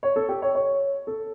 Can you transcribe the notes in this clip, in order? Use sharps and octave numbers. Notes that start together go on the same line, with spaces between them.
C#5
A4
G4
C#5
C#5
A4